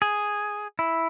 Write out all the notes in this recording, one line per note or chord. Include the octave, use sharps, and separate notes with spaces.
G#4
E4